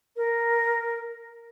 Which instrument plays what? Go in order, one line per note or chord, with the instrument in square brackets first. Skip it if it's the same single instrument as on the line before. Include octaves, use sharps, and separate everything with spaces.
[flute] A#4